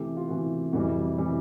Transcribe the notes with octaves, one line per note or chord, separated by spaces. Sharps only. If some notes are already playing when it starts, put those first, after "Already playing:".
Already playing: C3 E3 A3 G4
F4
C3 E3 A3 F#4
F2 C3 E3 G3 F#4
C3 E3 G3